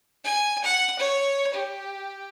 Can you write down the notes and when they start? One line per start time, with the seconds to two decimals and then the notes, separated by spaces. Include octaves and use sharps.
0.24 G#5
0.64 F#5
0.99 C#5
1.54 G4